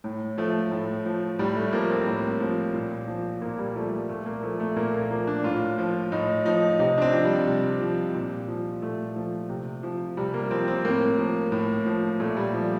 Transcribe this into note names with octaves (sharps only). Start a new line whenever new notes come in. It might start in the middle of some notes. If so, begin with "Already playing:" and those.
A2
F3 A3
A2
F3
A2 G3
A3
F3 A#3
C4
A2
F3
A#2
F3
A#2 A#3
G3
F3 A3
G3
A#2 A3
A#3
F3 A3
A3
A#2 A#3
A#3
F3 A#3
D4
A2 F4
F3
A2 D#4
F3 D#4
C3 D#4
D4
C4
F3
G3
C3
F3
A#2
F3
A#2 A3
F3
C3
F3
C3 G3
A#3
F3 C4
C4
A2 A#3
F3
A2
F3
A#2 A3
G3
F3